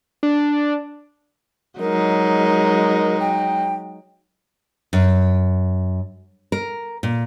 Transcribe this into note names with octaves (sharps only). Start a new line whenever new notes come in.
D4
F#3 G#3 D#4 A#4
G5
F#2
A#4
A#2